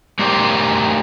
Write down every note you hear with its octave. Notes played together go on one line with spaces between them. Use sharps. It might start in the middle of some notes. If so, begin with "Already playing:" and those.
A3 G4 A#4 C5 D5